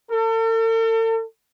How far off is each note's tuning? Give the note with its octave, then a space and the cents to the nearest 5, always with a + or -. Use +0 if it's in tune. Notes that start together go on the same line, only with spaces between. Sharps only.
A4 +45